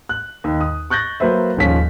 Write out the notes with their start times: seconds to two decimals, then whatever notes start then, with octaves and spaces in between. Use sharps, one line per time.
0.09 F#6
0.44 D#2
0.61 D#6
0.90 C#6 F#6 G6 A6 A#6
1.20 F#3 A#3 B4 C5 E5
1.57 D#1 G#2 F3 C#4 F4 B6